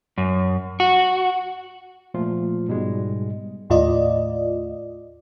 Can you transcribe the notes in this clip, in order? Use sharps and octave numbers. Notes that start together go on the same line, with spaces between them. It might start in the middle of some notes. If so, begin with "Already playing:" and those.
F#2
F#4
A#2 F3 A3 F4
G#2 B2 G3 G#3
D#2 A2 F4 D5 D#5